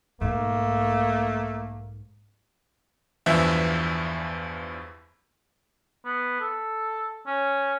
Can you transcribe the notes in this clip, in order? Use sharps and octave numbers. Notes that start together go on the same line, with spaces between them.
B1 G#2 A3 A#3
E2 G2 E3 F3 E5
B3
A4
C#4